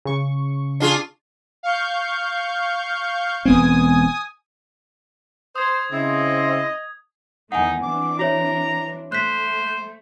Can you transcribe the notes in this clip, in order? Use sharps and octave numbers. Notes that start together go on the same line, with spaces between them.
C#3 C#6
D4 F4 G#4
F5 C#6 G6
E1 B3 C4 G#5 D#6
C5 D#6 G#6
C#3 C4 E4 D#5
E2 D#3 A3 D#4 F#5 G#5
E3 C4 D4 D6
F#4 C#5 E5 A#5
A3 C5 F#6 B6